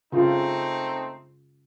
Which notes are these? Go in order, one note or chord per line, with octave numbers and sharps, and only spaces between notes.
C#3 A3 C4 D#4 F4